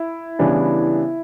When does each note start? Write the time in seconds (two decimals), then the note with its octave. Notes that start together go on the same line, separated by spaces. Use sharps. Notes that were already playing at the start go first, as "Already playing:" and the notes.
Already playing: E4
0.39 C#3 E3 G3 B3 D4